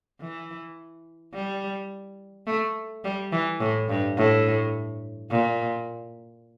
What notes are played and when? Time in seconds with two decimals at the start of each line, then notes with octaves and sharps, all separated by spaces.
0.21 E3
1.34 G3
2.47 A3
3.04 G3
3.32 E3
3.60 A2
3.89 G2
4.17 A2
5.30 A#2